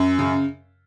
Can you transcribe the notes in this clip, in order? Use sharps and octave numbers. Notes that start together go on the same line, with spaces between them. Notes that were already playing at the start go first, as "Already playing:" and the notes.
Already playing: F#2
C#3